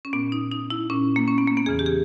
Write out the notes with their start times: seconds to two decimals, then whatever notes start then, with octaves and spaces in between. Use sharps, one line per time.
0.05 C#4
0.13 A#2 B3
0.32 D#4
0.52 D#4
0.70 E4
0.90 A#2 C#4
1.16 A#3
1.28 C#4
1.38 B3
1.48 A#3
1.57 B3
1.66 E2 C#3 E3 G#4
1.79 G4
1.86 G#4